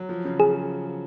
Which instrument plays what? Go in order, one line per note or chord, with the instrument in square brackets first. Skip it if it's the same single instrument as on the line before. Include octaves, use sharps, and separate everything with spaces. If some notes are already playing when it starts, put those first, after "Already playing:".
Already playing: [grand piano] F#3
F3
C#3
[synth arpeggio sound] G#4